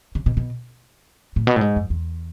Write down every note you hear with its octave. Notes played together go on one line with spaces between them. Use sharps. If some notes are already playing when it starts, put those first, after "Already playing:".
C#3
B2
B2
A2
B2
A2
G#2
F#2
E2